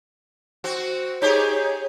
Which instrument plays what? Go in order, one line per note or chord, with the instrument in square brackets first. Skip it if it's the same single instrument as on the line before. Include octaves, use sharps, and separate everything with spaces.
[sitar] C4 F#4
[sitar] D#4 G4 G#4 [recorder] C#5